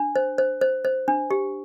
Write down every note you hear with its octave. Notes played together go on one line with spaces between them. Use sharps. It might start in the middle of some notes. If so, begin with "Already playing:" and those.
Already playing: D4
C5
C5
C5
C5
D4
G4